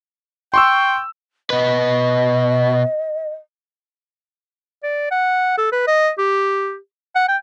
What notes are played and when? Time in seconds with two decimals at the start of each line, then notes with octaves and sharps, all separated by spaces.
0.54 G5 C6 C#6 E6
1.50 B2 B4 D#5
4.83 D5
5.11 F#5
5.58 A4
5.72 B4
5.87 D#5
6.18 G4
7.15 F#5
7.28 G5